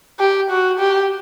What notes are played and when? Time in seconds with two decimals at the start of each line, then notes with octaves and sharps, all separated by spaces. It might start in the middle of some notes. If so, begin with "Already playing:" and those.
0.19 G4
0.50 F#4
0.79 G4